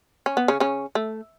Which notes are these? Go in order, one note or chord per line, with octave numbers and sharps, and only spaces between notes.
C#4
B3
C#3 C#4
C#3 C#4
A3